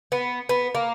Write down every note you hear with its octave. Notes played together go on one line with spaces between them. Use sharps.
B3
B3
A#3